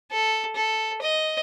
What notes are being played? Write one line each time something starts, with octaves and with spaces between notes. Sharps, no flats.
A4
A4
D#5